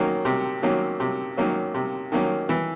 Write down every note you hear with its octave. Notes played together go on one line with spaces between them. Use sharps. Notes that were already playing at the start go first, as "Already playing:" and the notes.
Already playing: D#3 F#3 A#3 C#4
C3
D#3 F#3 A#3 C#4
C3
D#3 F#3 A#3 C#4
C3
D#3 F#3 A#3 C#4
E3